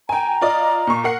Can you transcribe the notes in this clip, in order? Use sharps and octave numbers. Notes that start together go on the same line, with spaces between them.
G5 G#5 A#5
F4 D5 D#5
A#2 C#6
A#4 F#5 C7